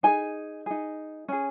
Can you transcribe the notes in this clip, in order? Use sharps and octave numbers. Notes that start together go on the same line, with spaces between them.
D#4 G#4 G#5
D#4 G#4
C#4 G#4